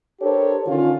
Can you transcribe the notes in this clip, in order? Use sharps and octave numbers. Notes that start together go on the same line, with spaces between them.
D4 G4 A4 A#4 C5 C#5
D3 D#3 C#4 F4